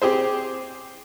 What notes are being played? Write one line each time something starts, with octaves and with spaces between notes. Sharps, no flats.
C4 G4 G#4 C5